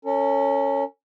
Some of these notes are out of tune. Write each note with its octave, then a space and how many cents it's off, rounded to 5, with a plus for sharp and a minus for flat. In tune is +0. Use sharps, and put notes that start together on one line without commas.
C#4 +0 A4 +45